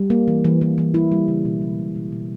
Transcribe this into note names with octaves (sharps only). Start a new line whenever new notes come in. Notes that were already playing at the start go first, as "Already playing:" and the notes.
Already playing: G3
A#3
E3
E3
E3
E3
G3 E4
G3
C#3
B2
G#3
B2
B2
B2